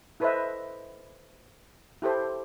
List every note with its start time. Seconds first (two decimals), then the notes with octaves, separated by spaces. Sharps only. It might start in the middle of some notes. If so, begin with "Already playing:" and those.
0.20 E4 A4 B4 C5 D#5 E5
2.02 E4 G4 A4 C5